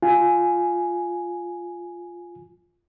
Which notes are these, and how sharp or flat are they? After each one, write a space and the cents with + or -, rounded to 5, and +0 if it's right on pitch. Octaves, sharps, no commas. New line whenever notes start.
F4 +0 G#5 +5